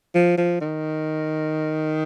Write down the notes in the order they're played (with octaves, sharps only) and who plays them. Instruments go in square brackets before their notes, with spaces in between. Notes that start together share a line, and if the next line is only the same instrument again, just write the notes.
[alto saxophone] F3
F3
D#3